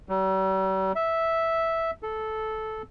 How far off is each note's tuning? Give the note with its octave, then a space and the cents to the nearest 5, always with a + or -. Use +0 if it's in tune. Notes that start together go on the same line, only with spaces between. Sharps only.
G3 -45
E5 -5
A4 -10